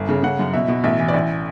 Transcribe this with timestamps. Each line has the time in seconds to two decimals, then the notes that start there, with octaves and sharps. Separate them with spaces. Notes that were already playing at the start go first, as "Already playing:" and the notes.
Already playing: G1
0.09 C#3
0.23 C#3 F#5
0.39 F#2
0.53 B2 E5
0.68 B2
0.84 A1 E5
1.00 E3
1.08 D5
1.14 A1 E5